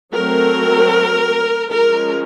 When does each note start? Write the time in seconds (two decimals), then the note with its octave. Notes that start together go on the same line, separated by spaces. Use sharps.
0.13 F#3 A3 C4 A#4
1.70 F3 G#3 C#4 A#4